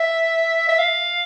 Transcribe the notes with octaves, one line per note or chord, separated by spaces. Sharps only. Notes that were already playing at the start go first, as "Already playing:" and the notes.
Already playing: E5
E5
F5